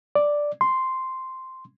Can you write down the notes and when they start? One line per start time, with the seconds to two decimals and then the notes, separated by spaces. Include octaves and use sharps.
0.15 D5
0.61 C6